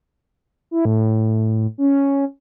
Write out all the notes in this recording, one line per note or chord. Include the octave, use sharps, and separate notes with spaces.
E4
A2
C#4